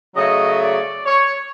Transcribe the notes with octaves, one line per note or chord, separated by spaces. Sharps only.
C#3 F#3 A3 D#5
D5
C#5